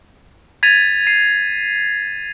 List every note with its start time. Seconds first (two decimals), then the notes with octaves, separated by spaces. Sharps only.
0.63 G#6 A6 B6 D#7 F7
1.07 C7 D#7